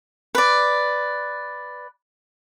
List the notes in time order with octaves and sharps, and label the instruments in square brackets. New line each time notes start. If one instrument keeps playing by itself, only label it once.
[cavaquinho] B4 D5